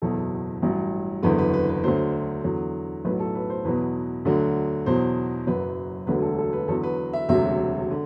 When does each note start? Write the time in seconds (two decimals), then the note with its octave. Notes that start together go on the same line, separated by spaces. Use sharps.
0.02 F#1 E2 B2 F#3 A4
0.62 A1 G2 F#3
1.23 F#1 E2 D3 B4
1.38 B4
1.53 B4
1.69 B4
1.84 D2 D3 F#3 C5
2.44 E2 D3 F#3
3.05 B1 A2 F#3 B4
3.20 A4
3.35 B4
3.50 C5
3.65 E2 B2 F#3 B4
4.25 D2 D3 F#3
4.86 E2 B2 F#3 C5
5.47 F#1 F#2 F#3 B4
6.07 E1 D2 D3 F#3 B4
6.22 A4
6.38 A4
6.53 B4
6.68 E2 D3 F#3 A4
6.83 B4
7.13 E5
7.29 E1 D2 C3 F#3 E5
7.91 D3